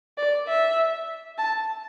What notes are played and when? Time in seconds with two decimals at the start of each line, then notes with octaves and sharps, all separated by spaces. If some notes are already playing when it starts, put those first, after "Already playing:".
0.18 D5
0.48 E5
1.38 A5